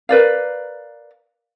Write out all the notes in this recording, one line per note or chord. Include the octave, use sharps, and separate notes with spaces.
A#4 B4 D5 F5